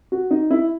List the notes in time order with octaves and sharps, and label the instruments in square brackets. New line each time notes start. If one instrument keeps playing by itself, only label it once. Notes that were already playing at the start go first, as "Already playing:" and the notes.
[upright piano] F#4
D#4
E4